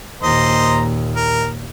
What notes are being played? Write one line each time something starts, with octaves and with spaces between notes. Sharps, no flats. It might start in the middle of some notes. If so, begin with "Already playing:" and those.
D#2 A#2 C5 D#5 A#5
A#4